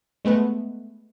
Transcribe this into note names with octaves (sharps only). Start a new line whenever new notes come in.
G#3 A3 B3 B4